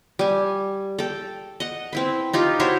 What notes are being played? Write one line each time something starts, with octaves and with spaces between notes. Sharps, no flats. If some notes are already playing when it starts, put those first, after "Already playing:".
G3 G#5
A4 G5
D#5 F#5
C4 E4 B4
D#4 F4 G4
E4 F#4 C5 C#5